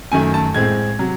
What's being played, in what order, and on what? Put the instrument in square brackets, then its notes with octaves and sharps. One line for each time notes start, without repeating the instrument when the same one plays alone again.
[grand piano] F#2 D#3 A3 G#5
A5
A2 G#3 C4 G#6
C3 F#3